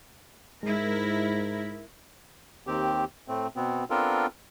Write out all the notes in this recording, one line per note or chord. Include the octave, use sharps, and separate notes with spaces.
G#2 G#3 E4 A#4
D#2 D#3 C4 G4
A2 A3 C4
B2 B3 C4
B3 C4 D4 F4 A4 A#4